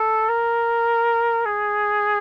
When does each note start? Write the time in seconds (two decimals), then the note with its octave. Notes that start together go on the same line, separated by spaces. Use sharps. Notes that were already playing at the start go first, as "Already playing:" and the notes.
Already playing: A4
0.29 A#4
1.46 G#4